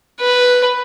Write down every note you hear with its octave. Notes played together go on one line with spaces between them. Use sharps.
B4